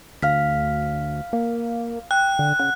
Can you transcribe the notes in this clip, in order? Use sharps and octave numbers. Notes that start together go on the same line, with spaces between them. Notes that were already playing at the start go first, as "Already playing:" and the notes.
D2 F5 F6 B6
A#3
G5 F#6
D3
C#3 F#5